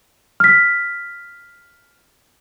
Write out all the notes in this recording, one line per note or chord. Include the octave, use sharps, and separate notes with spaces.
F6 B6